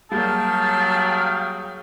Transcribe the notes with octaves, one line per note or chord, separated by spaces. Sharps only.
F#3 G3 A#3 G#4 F5 G5 A5